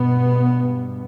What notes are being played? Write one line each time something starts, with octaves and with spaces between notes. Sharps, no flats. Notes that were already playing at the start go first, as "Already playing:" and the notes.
Already playing: G2 B2 B3